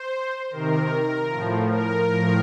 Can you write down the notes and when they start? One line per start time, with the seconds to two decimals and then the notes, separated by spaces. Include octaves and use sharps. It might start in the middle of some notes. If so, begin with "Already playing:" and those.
Already playing: C5
0.50 C3 D#3 A#4
1.29 A2 F3
1.69 A#4
2.07 A2 F3